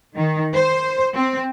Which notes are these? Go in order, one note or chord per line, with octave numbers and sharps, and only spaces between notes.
D#3
C5
C4